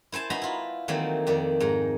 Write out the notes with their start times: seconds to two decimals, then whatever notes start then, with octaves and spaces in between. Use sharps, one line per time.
0.12 E4 C5 G#5 A5
0.30 D#4 F#4 B4 A#5 C6
0.42 E4 F4
0.88 D#3 E3 F#3 A3 A#3 C4
1.27 F2 D#3 D5
1.60 G#2 A#5